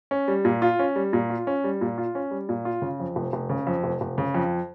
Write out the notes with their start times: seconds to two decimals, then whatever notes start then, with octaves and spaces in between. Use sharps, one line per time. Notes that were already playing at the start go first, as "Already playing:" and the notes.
0.11 C#4
0.28 G3
0.45 A#2
0.62 F4
0.79 C#4
0.96 G3
1.13 A#2
1.30 F4
1.47 C#4
1.64 G3
1.81 A#2
1.98 F4
2.15 C#4
2.31 G3
2.49 A#2
2.65 F4
2.82 C#3
3.00 F2
3.16 F1
3.33 F1
3.49 C#3
3.67 F2
3.84 F1
4.01 F1
4.18 C#3
4.34 F2